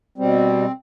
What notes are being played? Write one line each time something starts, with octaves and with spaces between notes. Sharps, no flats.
B2 G3 C4